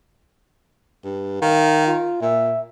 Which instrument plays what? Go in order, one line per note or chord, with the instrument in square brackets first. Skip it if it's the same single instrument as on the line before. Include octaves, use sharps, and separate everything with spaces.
[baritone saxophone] G2
[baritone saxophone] D#3 [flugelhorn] F5
[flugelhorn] F4
[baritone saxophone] A#2 [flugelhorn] E5